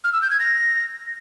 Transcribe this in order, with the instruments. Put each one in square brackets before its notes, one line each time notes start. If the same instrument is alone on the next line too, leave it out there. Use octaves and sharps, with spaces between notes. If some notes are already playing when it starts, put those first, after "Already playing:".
[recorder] F6
E6
G6
G#6
A#6